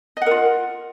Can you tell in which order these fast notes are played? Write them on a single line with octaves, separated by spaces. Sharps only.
D#5 F#5 A#4 F4